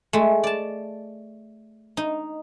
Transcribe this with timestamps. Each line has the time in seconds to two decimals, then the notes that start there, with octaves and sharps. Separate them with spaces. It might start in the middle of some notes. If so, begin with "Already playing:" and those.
0.13 G#3 A3
0.44 D5 A5
1.97 D#4